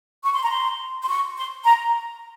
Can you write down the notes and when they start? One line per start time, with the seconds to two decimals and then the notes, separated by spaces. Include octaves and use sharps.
0.24 C#6
0.33 C6
0.42 A#5
0.50 C6
1.02 C6
1.08 C#6
1.37 C6
1.64 A#5